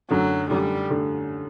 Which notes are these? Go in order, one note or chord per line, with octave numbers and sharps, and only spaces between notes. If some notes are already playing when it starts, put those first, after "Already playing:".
F#2 D3 F#3 A3
F#2 D3 G3 A3
D3 A3